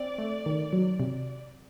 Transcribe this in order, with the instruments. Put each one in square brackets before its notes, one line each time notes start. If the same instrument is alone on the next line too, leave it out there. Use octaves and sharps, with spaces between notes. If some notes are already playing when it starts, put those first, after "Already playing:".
Already playing: [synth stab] C4 [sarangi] D5
[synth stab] A3
D#3
F#3
C3